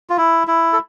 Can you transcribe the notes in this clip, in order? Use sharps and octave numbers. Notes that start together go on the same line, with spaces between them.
F4
E4
E4
A4